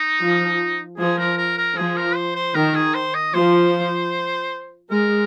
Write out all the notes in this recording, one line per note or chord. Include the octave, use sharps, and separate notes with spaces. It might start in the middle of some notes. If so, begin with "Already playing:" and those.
Already playing: D#4
F3
F3 G#4
A#4
A#4
A#4
F3 G#4
A#4
C5
C5
D#3 A#4
G#4
C5
D#5
F3 C5
G#3 A#4